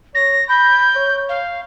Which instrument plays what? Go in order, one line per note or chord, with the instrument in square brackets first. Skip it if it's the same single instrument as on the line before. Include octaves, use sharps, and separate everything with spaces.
[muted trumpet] C#5 [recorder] A#6
[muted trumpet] B5 [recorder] G6
[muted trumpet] C#5
[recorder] F5